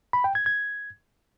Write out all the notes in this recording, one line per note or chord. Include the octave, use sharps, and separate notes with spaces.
B5
G5
G#6
G#6